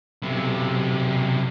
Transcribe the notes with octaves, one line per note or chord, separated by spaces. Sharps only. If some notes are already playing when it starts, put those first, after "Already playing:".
B1 C3